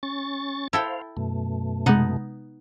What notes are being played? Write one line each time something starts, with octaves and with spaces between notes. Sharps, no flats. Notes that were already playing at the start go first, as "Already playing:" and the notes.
C#4 C#6 A6
E4 A4 C5 F5 G5
F#2 B2 A3
C3 G#3 B3 D#4 F#5